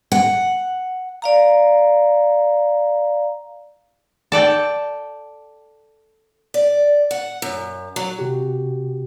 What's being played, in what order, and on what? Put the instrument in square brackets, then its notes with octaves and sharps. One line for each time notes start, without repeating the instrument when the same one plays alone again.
[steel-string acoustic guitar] F#5
[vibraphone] D5 F5 A#5
[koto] A4 D5 G5
[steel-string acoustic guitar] D5
F#5
F#2
F#3
[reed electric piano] C3 F#4 G4